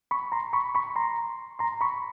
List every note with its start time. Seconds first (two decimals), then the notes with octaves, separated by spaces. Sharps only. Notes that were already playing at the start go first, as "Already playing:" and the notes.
0.11 B5 C#6
0.32 A#5 C6
0.53 B5 C#6
0.75 B5 C#6
0.96 A#5 C6
1.59 A#5 C6
1.81 B5 C#6